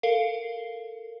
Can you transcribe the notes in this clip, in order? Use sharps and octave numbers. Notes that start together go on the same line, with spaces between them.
A4 A#4 F5 C7